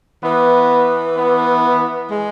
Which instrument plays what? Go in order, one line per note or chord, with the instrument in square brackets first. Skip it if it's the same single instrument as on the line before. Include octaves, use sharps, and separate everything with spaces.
[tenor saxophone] E3 [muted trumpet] B3
[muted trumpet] B3
[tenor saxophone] G#3